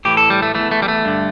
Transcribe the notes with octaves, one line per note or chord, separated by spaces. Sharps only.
A2 E3 G4
A4
G3
A3
E2 E3 A3
A3
G3
A3
G2 D3